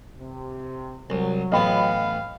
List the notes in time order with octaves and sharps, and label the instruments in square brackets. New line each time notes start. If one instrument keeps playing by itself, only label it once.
[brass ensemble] C3
[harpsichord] C2 [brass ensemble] F#3
[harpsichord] A1 B3 [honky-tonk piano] D#5 G5 B5 [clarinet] F5